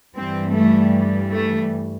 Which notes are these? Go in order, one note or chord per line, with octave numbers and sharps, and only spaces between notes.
G2 E3 G3 C4
A3
A3